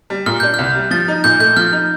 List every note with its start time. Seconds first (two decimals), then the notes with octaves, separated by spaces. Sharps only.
0.10 G3
0.26 A#2 F6
0.40 D4 G6
0.54 C2 F6
0.75 G3
0.91 F3 A6
1.08 D#4
1.24 A#2 G6
1.40 A3 G6
1.57 F3 F6
1.72 D#4